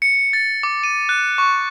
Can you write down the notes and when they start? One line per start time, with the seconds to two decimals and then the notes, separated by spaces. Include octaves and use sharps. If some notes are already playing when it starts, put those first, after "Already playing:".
0.02 C#7
0.33 A6
0.63 D6
0.84 D#7
1.09 F#6
1.38 C#6